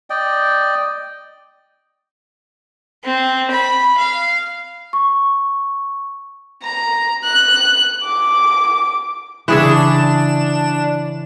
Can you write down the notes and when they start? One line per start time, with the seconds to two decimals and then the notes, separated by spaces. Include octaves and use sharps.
0.10 D5 D#5 G5
3.04 C4
3.51 B5
3.98 F5
4.93 C#6
6.63 A#5
7.24 F#6
8.04 D6
9.48 C#3 E3 D4 G#4 E5 C#6 E7